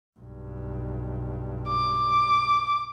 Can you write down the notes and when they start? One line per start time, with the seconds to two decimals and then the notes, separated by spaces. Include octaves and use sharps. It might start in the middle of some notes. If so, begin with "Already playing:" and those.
0.19 B1 G2
1.68 D6